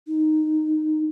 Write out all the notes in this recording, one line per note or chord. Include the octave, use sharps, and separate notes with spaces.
D#4